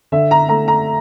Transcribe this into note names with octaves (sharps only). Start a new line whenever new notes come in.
D3 E5
A#5
A3 A#5
A#5